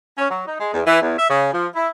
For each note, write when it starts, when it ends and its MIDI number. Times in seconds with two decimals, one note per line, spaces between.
0.17 0.28 61
0.30 0.45 54
0.46 0.58 63
0.59 0.73 56
0.73 0.81 40
0.86 1.01 52
1.02 1.16 40
1.18 1.25 76
1.30 1.51 49
1.53 1.66 53
1.75 1.89 64